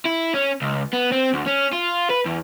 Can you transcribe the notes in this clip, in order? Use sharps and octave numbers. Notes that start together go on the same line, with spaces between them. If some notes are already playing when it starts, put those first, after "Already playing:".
E4
C#4
C#2
B3
C4
D2
C#4
F4
B4
E2